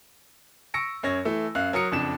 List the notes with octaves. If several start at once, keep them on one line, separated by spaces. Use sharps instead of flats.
C#6 E6 A#6 C#7 D7
F#2 C#5 A#6
E3 A3 E6
F#2 F5 F#6
F#3 A#4 D#6 C#7
F#1 F2 D4 E7